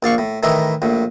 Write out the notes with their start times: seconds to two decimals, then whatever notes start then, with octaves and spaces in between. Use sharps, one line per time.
0.03 A#1 D5 F5 C#6
0.18 A2
0.43 A2 D#3 E3 D#4 E4
0.82 A#1 A2